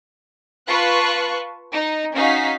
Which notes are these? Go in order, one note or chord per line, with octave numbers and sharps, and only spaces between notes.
F4 B4 A5 C#6 F#6
D#4
C#4 D#4 F#4 F5 B6